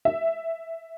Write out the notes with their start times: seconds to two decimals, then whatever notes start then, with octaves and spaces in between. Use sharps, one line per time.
0.05 E5